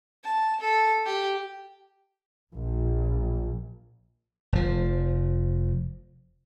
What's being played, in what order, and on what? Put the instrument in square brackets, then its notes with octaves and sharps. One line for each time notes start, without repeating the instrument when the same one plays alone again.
[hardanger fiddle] A5
A4
G4
[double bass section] A#1
[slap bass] F1 F3